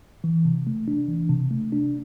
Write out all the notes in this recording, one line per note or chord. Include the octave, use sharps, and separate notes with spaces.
E3
C3
A3
D4
E3
C3
A3
D4